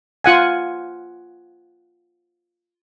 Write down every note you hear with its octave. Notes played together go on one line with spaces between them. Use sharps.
F4 F#5 G#5